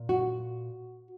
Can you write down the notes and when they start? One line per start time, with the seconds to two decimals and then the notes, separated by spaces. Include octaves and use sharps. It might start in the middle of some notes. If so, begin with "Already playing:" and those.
Already playing: A#2
0.09 F#4